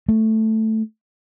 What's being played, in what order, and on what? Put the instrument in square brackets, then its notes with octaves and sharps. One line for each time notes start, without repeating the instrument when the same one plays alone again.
[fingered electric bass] A3